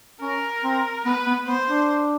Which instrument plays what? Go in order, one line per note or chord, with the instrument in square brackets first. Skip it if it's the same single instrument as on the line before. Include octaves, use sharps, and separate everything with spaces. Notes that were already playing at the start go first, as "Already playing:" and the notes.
[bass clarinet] C#4 [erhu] A#4
[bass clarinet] C4
[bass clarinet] B3 [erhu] B4
[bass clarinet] B3
[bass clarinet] B3 [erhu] C5
[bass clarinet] D4